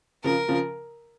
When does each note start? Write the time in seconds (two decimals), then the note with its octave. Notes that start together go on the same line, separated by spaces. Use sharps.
0.24 C#3 F3 A#4
0.48 C#3 F3